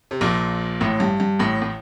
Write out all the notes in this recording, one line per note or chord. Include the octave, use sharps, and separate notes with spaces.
C3
A#1 A#2
A1 A2
G2
G2
A1 A2
A2